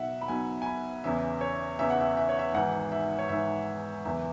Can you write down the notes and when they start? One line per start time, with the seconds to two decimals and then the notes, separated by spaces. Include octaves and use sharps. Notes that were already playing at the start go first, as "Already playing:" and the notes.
Already playing: B1 B2 F#3 E5 F#5
0.21 B5
0.28 B1 B2 F#3 G#5
0.62 G#5
0.66 B5
1.04 E2 C#3 E3 E5
1.41 C#5
1.79 E2 C#3 E3 E5
1.90 F#5
2.01 E5
2.17 E5
2.29 C#5
2.39 E5
2.54 G#1 G#2 E3 F#5
2.92 E5
3.19 C#5
3.29 G#1 G#2 E3 E5
4.05 F#1 E2 E3 E5